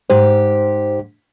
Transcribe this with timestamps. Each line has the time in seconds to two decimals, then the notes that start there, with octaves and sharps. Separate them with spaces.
0.10 G#2 G4 C5